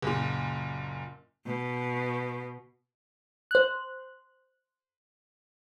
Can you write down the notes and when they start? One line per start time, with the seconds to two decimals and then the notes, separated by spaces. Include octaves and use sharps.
0.02 F#1 A#2
1.45 B2
3.51 C5 F#6